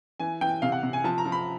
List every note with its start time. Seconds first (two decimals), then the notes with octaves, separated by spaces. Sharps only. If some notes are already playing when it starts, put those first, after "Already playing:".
0.20 E3 G#5
0.41 E3 G5
0.62 C3 F5
0.72 F#5
0.83 C3
0.93 G#5
1.04 F3 A5
1.18 A#5
1.25 F3
1.32 B5